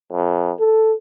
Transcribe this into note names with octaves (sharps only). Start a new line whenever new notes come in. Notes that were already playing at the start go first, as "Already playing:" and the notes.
F2
A4